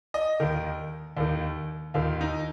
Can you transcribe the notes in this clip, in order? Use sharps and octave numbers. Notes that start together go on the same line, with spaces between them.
D#5
D#2 D#3
D#2 D#3
D#2 D#3 F4
D#4